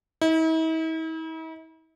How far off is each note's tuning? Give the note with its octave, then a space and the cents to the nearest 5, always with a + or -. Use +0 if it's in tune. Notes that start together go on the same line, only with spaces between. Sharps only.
E4 -45